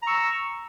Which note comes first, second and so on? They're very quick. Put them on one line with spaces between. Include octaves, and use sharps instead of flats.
A#5 C#6 E6